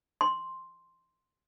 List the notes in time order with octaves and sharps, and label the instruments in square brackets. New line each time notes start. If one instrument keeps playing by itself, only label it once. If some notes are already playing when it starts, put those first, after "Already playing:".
[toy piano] C6